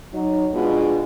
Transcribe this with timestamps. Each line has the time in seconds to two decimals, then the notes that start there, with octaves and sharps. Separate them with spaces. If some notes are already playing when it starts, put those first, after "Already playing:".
0.14 F#3 D#4
0.54 B2 G#3 B3 D4 F4